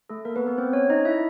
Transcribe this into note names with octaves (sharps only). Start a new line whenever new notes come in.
A3 A4
A#3 A#4
B3 B4
B3 B4
C4 C5
C#4 C#5
D#4 D#5
E4 E5